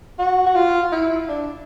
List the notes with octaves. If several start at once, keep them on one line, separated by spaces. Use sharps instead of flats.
F#4
F#4
F4
E4
D4